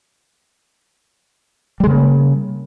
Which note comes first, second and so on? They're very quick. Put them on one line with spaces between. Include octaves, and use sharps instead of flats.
G3 G#3 C#3 A#3